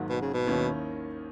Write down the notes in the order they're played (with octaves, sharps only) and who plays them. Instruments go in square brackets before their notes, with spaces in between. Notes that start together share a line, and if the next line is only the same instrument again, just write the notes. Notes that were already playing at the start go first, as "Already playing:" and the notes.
Already playing: [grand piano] G#1 G#2 D#3 F#3 A#3
[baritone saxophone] B2
C#3
B2
[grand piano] D#2 D#3 A#3 C#4 E4